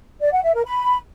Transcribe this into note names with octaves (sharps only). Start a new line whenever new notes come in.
D5
F#5
E5
A#4
B5